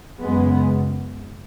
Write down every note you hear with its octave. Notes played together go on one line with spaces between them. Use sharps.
F#2 C#3 G#3 B3